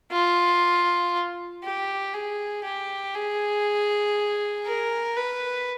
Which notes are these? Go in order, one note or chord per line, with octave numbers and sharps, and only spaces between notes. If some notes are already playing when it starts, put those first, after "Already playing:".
F4
G4
G#4
G4
G#4
A#4
B4